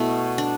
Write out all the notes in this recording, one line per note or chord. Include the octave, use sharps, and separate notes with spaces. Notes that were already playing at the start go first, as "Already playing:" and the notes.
Already playing: B2 A3 E4
D4